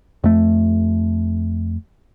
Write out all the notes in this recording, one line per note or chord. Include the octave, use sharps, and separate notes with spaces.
F2 A3